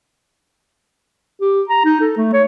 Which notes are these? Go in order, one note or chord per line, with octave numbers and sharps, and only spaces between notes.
G4
A#5
D#4
A4
A3
C#5